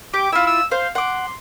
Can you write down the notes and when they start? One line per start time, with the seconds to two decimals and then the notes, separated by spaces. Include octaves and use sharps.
0.14 G4 D6
0.32 E4 F4 E6
0.47 E6
0.71 C5 F5
0.95 F#5 C6 D6